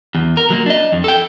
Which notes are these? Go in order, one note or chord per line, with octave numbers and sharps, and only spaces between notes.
E2
A#4
F#3 A#3
D4 D#5
F2
A4 G5